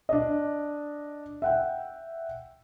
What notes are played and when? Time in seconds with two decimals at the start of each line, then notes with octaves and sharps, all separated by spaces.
0.09 D4 D5 D#5
1.42 E5 F#5 G5